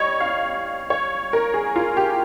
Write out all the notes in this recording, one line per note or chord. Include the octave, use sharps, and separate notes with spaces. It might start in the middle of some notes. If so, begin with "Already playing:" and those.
Already playing: G3 C#5 D#5
F5
C#5
A#4
G#4
F4
G4